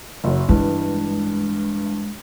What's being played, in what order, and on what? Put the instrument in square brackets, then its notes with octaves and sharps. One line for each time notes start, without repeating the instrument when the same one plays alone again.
[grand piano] F#1 F#3
[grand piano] G2 E3 [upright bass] G#3